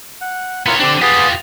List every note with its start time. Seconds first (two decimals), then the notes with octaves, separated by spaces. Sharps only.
0.21 F#5
0.66 B3 E4 F4 A#4 C#5
0.80 D3 C4 D4 G4
1.02 F4 G4 G#4 B4 F#5